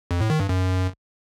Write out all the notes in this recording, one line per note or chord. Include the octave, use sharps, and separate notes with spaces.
F2
A2
D#3
G2
F#2